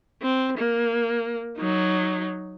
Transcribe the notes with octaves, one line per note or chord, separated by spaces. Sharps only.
C4
A#3
F#3 D#4